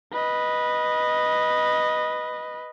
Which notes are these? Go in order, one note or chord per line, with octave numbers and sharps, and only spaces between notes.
B4 D#5